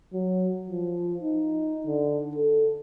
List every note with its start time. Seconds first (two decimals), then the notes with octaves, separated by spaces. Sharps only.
0.14 F#3
0.70 F3
1.22 D#4
1.86 D3
2.36 A4